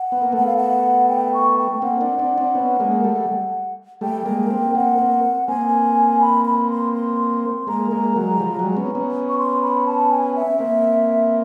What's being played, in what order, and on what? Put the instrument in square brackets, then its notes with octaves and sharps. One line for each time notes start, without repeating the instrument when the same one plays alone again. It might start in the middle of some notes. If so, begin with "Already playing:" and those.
Already playing: [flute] F#5
[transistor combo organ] B3
A#3
[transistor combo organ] A3 B3 [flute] F#5
[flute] F5
F#5
G5
C#6
G5
[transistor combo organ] A#3 C4 [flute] F#5
[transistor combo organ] C4 D4
C4 D4
C4 D4
B3 C#4
G#3 A#3
G3 A3
[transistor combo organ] G3 A3 [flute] G5
[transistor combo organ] G#3 A#3
A#3 C4
[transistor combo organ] A#3 C4 [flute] F#5
[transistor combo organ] A#3 C4
[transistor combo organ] A#3 C4 [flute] G#5
[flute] B5
B5
C6
C6
[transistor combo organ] G#3 A#3 [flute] A#5
[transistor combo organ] G#3 A#3
F#3 G#3
F3 G3
F#3 G#3
B3 C#4
B3 C#4
[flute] C#6
C6
B5
A5
G#5
E5
[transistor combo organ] A#3 C4